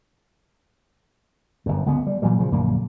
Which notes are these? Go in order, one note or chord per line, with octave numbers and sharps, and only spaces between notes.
G1 F#2
C#2 D3 B3
G3
A#2 E3 F#3 G3
C#3 F3
A#1 F#2 D3 A#3